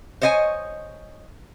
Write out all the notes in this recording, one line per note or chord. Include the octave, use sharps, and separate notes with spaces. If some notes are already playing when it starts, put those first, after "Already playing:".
C5 C#5 D#5 F5 G#5